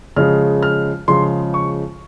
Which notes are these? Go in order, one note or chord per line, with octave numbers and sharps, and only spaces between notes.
C#3 F3 G#3 F6
F6
C#3 F3 G#3 C6
C#6